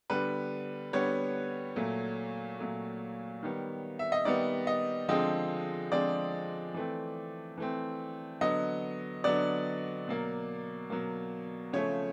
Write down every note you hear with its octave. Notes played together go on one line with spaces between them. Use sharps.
D3 G3 B3 B4
D3 G3 B3 C#5
A#2 F#3 A3
A#2 F#3 A3
D#3 G3 B3
E5
D#5
D#3 G3 B3 D5
D#5
D3 F3 G#3 C4 D#5
D3 F3 G#3 C4 D5
E3 A3 C4
E3 A3 C4
D3 F#3 B3 D#5
D3 F#3 B3 D5
B2 F#3 A#3
B2 F#3 A#3
C#3 F3 A3 C#5